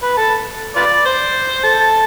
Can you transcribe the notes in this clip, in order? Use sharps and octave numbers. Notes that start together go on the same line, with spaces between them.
B4
A4
F4 B4 D5
C5
A4